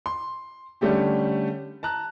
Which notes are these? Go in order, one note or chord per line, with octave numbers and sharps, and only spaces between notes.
C6
D3 G3 A3 C#4 G4
A5 A#5 F#6